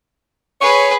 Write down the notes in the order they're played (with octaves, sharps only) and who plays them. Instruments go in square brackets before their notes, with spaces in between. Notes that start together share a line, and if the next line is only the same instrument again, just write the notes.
[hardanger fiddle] G#4 B4 [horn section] C#5